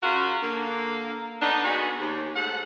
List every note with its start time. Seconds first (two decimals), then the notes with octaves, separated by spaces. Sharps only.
0.03 C#3 F#3 F4 F#4 A#4
0.41 D3 A#3
1.42 D3 B3 D4 D#4
1.65 B3 D#4 F#4 G#4
2.00 D#2
2.36 G#2 A3 F#5